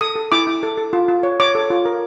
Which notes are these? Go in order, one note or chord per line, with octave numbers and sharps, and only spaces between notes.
A4 D#6
A4
E4 D6
E4
A4
A4
F4
F4
C#5
C#5 D6
A4
F4
A#4